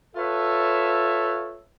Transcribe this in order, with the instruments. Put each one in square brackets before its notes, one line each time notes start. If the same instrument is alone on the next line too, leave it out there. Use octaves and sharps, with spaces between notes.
[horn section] F4 A4 B4 C#5 E5